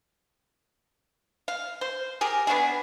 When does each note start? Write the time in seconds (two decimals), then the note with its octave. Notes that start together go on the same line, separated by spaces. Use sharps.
1.48 F5
1.81 C5
2.21 G4 G#4 A#4
2.47 B3 D4 F#4 G#4